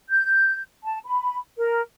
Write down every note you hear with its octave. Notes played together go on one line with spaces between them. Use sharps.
G6
A5
B5
A#4